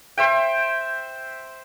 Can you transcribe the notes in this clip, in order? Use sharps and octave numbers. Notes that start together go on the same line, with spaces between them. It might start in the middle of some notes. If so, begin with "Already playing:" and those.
C5 E5 G5